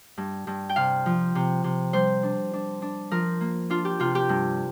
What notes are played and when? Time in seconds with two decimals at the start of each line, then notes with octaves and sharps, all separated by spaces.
0.17 G2
0.47 G2
0.69 G5
0.76 C3 F5
1.06 F3
1.35 C3
1.64 C3
1.93 G3 C5
2.23 D4
2.53 D4
2.82 D4
3.11 F3 A#4
3.41 A#3
3.70 D4 F4
3.85 G4
4.00 C3 F4
4.15 G4
4.29 G2